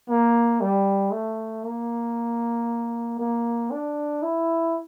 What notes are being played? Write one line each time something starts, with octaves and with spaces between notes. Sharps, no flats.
A#3
G3
A3
A#3
A#3
D4
E4